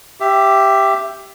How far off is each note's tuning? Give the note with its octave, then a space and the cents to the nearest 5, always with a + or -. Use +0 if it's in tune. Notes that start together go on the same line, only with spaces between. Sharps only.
G4 +0 E5 +15